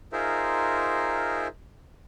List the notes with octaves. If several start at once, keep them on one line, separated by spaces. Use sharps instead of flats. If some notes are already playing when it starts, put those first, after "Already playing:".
D#4 F4 G#4 A#4 C5 E5